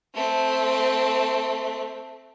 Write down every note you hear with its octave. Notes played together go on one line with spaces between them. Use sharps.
A3 C4